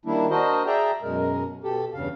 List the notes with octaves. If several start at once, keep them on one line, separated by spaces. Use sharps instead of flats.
D#3 G3 A#3 D4 E4
D4 F#4 A#4 C5 D#5
G#4 D5 E5 G5 A#5
F#2 B2 G#3 A#4
B2 G4 A4
E2 G2 C#3 F5